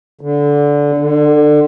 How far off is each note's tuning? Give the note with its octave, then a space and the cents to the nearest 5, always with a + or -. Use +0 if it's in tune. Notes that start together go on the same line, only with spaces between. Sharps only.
D3 -15
D3 +25